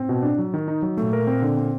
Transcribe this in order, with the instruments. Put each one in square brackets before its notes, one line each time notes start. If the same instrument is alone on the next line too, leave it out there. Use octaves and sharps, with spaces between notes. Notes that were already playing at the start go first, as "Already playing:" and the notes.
Already playing: [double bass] A2 [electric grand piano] C4
[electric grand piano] B2
D4
F#3
D#3
D#4
F#3
[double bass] A#2 [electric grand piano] A3
[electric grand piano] A#4
C4
D3
C4